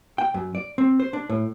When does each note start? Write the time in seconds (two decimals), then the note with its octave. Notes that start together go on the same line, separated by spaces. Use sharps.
0.18 G5
0.34 F#2
0.55 D5
0.78 C4
1.00 C5
1.13 D4
1.29 A2